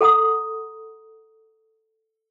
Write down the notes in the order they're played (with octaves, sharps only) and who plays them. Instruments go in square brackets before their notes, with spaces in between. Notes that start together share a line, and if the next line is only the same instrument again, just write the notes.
[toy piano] A4 F#5 A#5 D#6